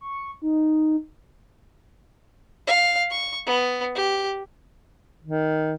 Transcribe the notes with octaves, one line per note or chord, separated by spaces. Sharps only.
C#6
D#4
F5
C#6
B3
G4
D#3